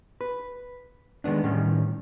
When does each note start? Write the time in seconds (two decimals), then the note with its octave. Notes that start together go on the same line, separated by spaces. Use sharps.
0.21 B4
1.24 D#3 G#3 B3 D4
1.43 A2 D#3 G3 C#4